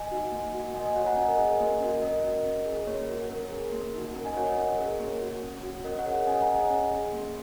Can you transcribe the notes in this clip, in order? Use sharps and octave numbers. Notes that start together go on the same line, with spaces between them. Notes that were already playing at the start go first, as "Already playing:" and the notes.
Already playing: D#5 G#5
D#4 F#4
A#3
F#4
A#3 D#5 G#5
D#5 G#5
F#4 C#5 F#5
F#5 A#5
C#4 D#5 G#5
A#4 D#5
G#4 D#5 G#5
A#3 A#4 D#5
C#4 F#4
C#4 A#4 D#5
F#4
C#4
G#4
A#4
A#3 C#5
F#4
C#4 A#4
G#4
A#3
D#4 F#4
C#4 A#4
D#5 G#5
F#4 C#5 F#5
A#4 D#5
C#4 C#5
G#4 A#4
A#3 C#5
F#4
C#4
F#4
C#4 A#4 D#5
C#5 F#5
G#4
C#5 F#5
C#4 D#5 G#5
F#5 A#5
G#4
D#5 G#5
C#4
G#4
A#3